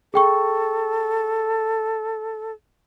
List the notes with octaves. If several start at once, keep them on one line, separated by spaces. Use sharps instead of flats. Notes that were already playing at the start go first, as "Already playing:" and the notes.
G#4 A4 G5 C#6